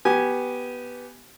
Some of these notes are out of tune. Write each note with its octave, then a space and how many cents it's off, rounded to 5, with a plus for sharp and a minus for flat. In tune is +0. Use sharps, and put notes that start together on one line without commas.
B3 -5 G4 -15 G#5 +0